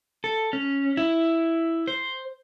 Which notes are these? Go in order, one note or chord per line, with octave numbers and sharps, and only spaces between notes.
A4
C#4
E4
C5